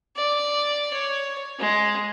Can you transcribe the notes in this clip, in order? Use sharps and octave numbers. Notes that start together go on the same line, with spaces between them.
D5
C#5
G#3